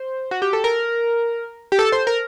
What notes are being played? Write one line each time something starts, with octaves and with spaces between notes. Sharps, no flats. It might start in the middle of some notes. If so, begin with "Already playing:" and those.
Already playing: C5
F#4
G4
A4
A#4
G4
A4
C5
A#4